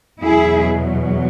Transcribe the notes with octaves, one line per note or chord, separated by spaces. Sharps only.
E2 B2 F#3 E4 G#4